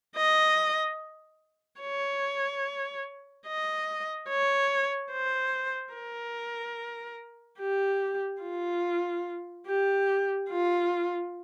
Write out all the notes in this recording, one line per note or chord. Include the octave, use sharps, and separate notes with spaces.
D#5
C#5
D#5
C#5
C5
A#4
G4
F4
G4
F4